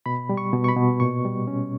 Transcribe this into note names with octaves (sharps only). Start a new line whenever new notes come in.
B2 B5
G3
C#6
B2
C#6
B5
B2
A#2 C#6
G3
C#4